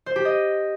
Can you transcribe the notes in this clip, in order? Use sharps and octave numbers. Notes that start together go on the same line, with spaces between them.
C5
G4
D#5